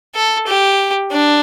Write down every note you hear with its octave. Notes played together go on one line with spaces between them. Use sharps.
A4
G4
D4